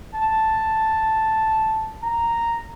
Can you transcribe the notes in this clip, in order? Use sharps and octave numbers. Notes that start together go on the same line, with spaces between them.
A5
A#5